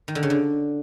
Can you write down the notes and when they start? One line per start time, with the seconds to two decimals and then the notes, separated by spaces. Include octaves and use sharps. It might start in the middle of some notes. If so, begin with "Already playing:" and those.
0.08 D#3
0.15 D3
0.23 C#3
0.30 D3